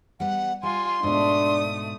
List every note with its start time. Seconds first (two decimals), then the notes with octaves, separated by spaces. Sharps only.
0.20 G3 B3 F#5
0.63 G3 F4 G#5 C6
1.03 G#2 B2 A3 D4 D#6